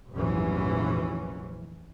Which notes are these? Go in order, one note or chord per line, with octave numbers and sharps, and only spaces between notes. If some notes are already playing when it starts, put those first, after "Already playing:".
F1 A#1 G#2 E3 F#3 C#4